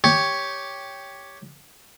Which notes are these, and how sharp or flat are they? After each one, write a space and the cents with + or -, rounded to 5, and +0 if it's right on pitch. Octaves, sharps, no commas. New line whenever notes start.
G4 +0 C#5 +5